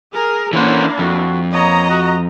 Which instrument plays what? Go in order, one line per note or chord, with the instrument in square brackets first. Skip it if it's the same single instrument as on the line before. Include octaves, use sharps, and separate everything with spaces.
[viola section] G#4 A#4
[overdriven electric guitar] E3 C#4 [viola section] A#3 D4 E4 [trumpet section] C5 C#5 F#5
[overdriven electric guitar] F2 [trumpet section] F#4
[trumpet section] A#3 B3 C#5 [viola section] D#5 A#5
[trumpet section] F#4